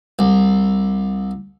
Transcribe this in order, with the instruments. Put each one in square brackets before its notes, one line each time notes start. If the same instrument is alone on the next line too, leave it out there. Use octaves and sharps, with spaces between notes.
[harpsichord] C2